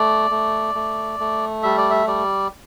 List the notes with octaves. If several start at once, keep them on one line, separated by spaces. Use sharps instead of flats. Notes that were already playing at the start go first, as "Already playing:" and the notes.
Already playing: A3 D5
A3
A3
A3
G3 E5
D5
E5
G3 D5